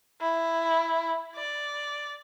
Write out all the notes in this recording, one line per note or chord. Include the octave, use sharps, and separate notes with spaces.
E4
D5